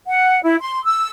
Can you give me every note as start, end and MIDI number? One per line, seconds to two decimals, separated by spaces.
0.08 0.42 78
0.43 0.56 64
0.62 0.83 84
0.84 1.10 88